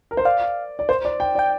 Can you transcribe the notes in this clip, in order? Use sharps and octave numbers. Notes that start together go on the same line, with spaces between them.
A#4
C5
D5 F5
D5
C5
D5
G5
D5
G5